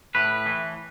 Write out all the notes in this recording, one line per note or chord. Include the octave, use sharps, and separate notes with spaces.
A2 B4
E3